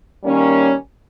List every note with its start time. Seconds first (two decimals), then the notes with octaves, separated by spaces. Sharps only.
0.23 D#3 G3 A#3 C#4